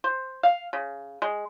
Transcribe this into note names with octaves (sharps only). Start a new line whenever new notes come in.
C5
F5
C#3
G#3